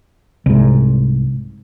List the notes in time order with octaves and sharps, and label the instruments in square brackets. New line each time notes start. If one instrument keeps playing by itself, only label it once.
[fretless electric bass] C2 G#2